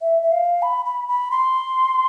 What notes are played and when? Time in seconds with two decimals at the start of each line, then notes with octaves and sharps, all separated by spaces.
0.01 E5
0.22 E5
0.32 F5
0.62 B5
0.85 B5
1.08 B5
1.31 C6